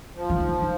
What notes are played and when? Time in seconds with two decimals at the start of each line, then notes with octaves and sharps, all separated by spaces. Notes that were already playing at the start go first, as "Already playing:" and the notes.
0.16 F3
0.30 E3
0.40 D#3
0.62 D#3